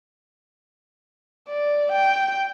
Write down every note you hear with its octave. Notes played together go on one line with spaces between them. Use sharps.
D5
G5